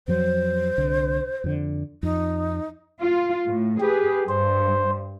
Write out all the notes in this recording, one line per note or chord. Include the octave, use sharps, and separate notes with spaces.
F2 F3 F#3 C5
C2 D3
F2 D3
F2 D#4
F4
A2
G4 G#4 B4
G2 C5